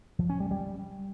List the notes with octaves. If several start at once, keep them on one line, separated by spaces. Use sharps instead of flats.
F3
C#4
G3
G3